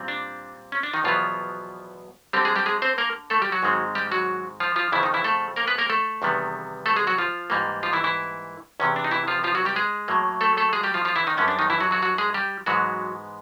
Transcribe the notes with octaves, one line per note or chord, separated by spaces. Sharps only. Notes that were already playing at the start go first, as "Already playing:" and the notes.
Already playing: A#2 G3 C4
D4
C#4
D4
D#3 D#4
E2 B2 F3 F#3 B3 F4
D3 G3 C4 G4
G#3 G#4
G3 G4
G#3 G#4
C4 C5
A#3 A#4
A3 A4
G3 G4
F#3 F#4
G#2 D#3 G#3 C4
G3 G4
F#3 F#4
F3 F4
F3 F4
F2 C#3 E3 F3 E4
D#3 D#4
E3 E4
A3 A4
A#3 A#4
B3 B4
A#3 A#4
A3 A4
E2 C3 D#3 G3 B3
A3 A4
G#3 G#4
F#3 F#4
F3 F4
G#2 E3 G3 A#3
F3 F4
E3 E4
E3 E4
E2 C3 E3 C#4
D4
D#4
E3 E4
F3 F4
F3 F4
F#3 F#4
G3 G4
G#3 G#4
A2 F#3 A#3
A3 A4
A3 A4
G#3 G#4
G3 G4
F3 F4
F3 F4
E3 E4
D#3 D#4
F#2 D3 G3 B3 C#4
D4
D#3 D#4
E3 E4
F#3 F#4
F#3 F#4
F#3 F#4
G#3 G#4
G3 G4
G#2 E3 F#3 G#3 B3 F#4